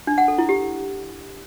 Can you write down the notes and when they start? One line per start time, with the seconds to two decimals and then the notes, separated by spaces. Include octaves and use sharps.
0.07 D4
0.18 F#5
0.28 A4
0.38 E4
0.49 G4